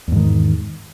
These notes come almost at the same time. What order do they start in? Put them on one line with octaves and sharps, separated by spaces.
E2 G#2 D#3